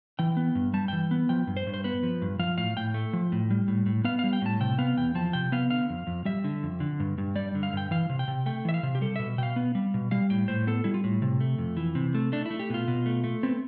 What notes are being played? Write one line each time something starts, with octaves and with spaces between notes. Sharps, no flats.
E3 G5
B3
G2
G3 A5
E3 G5
B3
F3 G5
G2
C5
G2
C5
B3 B4
F3
G2
F3 F5
A2 F5
A2 G5
A3
F3
A2
G3
A2
A2
B3 F5
G3 F5
G5
A2 A5
C3 G5
B3 F5
E2 G5
F3 A5
C3 G5
B3 F5
D3 F5
F2
F2
G3 E5
D3
F2
D3
G2
G2
G3 D5
D3
F5
G2 G5
E3 F5
C3
G5
C3
A3 G5
E3 E5
F5
C3
G4
G3 A4
B2 E5
B2 F5 G5
B3
G3
B2
G3 F5
A2 G5
A2 C5
B3 A4
G3 E4
F4
A2
C3
A3
F2
E3
C3
A3
A3 D4
A3 E4
G4
B2 F4
B2
A3
A3
B3 C4